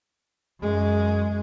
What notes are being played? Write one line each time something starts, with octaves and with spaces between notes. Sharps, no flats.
F#2 G#3